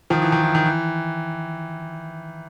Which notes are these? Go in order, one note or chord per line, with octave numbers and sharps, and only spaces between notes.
D#3 F3
E3
D#3
E3
D#3
E3